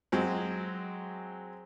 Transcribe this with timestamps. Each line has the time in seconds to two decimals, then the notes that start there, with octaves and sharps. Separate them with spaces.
0.12 F#3 G#3 C4